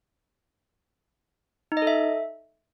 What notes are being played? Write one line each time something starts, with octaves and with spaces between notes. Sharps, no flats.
D#4
D#5
A4
E5